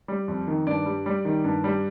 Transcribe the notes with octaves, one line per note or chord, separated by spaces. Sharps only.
G3
F2
D#3
G2 D5
G3
G3
D#3
G2
G3